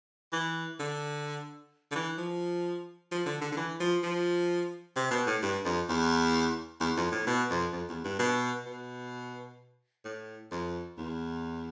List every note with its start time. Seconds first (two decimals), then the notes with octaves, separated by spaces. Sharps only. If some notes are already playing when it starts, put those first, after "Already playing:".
0.33 E3
0.80 D3
1.91 D3
1.95 E3
2.18 F3
3.12 F3
3.26 D3
3.41 D3
3.52 D3
3.57 E3
3.80 F3
4.03 F3
4.96 C3
5.11 B2
5.27 A2
5.42 G2
5.65 F2
5.89 E2
6.80 E2
6.97 F2
7.12 A2
7.27 B2
7.50 F2
7.73 F2
7.89 E2
8.04 G2
8.19 B2
8.66 B2
10.05 A2
10.51 F2
10.98 E2